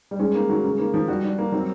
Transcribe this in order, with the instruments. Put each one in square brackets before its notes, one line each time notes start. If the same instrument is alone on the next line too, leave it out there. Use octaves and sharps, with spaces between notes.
[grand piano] G3
[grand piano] G#3 [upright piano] C#4
[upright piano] A#3
F#3
C#3
A#3
F3
[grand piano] G3 [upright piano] F#4
[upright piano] D4
A#3
[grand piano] F#3 [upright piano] C4